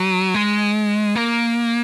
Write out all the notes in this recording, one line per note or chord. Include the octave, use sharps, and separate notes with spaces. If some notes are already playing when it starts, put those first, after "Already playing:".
Already playing: F#3
G#3
A#3